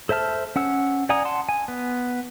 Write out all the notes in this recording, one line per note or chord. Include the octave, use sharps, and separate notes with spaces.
A4 C5 E5 A5 F6
C#4 F#5 E6
D5 F#5 G#5 A#5 D#6
F#5 A5 C6
G#5
B3